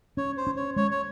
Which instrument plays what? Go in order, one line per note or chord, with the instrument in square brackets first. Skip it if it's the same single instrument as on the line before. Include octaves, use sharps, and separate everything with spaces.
[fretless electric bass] C#4 [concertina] C#5
[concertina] C5
[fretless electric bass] C#4
[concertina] C#5
[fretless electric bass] G#3 [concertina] C#5
[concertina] C#5